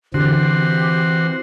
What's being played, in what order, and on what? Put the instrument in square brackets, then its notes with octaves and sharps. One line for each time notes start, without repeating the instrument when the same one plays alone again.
[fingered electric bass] D3 [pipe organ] E3 C4 [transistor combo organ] F#4 C6 [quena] G4